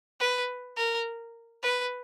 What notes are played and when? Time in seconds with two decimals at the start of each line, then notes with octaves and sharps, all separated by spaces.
0.20 B4
0.77 A#4
1.63 B4